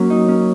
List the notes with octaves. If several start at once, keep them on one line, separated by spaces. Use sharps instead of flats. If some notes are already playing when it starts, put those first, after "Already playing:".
Already playing: F#3 A#3 C#4
D#4
C#4